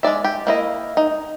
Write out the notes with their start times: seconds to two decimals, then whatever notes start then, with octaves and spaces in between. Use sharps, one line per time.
0.03 G#3 D#4 D5 E5
0.24 G4
0.47 A#3 E4 D#5
0.97 D#4